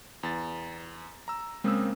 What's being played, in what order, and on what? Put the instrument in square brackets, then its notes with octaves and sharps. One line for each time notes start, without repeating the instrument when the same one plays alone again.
[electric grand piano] E2 A6
A#5 E6
[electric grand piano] C#3 A#3 C4 [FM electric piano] G#3 D#6 E6